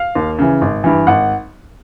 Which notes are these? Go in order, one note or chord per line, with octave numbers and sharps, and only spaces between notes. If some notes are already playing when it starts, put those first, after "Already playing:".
Already playing: F5
D#2
C#3 E3
G#1
G2 E3
G#1 F#5